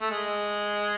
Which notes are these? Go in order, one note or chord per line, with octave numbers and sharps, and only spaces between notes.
A3
G#3